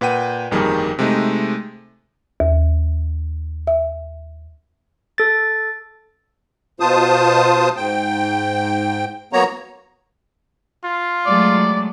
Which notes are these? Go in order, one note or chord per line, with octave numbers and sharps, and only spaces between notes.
A#2 B4 F#5 G5 D#7
G1 F2 D#3 G3 A#3 G#4
C3 G#3 A3 D#4
D#2
E5
A4 A6
B2 F4 C5 A5 D#6
G#2 G5
F#3 A#3 B3 C#5 A#5
F4
F#3 G#3 A3 D5